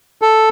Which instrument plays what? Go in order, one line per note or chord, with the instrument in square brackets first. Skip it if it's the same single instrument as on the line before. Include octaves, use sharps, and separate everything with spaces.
[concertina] A4